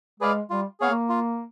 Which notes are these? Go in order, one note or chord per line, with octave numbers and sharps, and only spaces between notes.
G#3 G#4 B4 D5 F5
G3 F4
B3 G#4 C#5 F5
A#3
F4